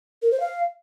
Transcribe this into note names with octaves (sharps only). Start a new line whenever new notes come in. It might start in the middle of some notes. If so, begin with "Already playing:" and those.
A#4
C5
F5